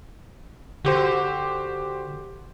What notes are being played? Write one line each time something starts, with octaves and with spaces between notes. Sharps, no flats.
D3 F#4 G4 C5